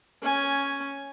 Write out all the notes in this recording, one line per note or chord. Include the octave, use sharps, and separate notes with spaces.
C#4 G#5